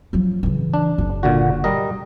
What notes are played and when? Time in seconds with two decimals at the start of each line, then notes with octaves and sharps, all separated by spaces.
0.13 F3 F#3
0.43 C#3 E3
0.74 D4
0.98 F#1
1.23 A#2 D3 F#4
1.64 G3 A#4 D#5